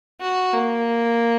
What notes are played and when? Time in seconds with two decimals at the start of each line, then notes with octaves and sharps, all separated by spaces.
0.21 F#4
0.53 A#3